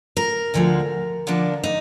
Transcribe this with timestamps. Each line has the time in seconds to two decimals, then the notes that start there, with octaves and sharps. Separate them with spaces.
0.17 A#4
0.54 D2 D3 F3 G#3
1.27 D3 F3 A#3 D4
1.64 D#4